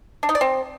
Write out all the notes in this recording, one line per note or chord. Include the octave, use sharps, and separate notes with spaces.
D4
D#4
D5
C4